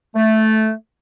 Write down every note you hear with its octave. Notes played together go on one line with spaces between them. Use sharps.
A3